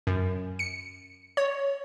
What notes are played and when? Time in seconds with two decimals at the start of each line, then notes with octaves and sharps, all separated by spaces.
0.07 F#2
0.59 C#7
1.37 C#5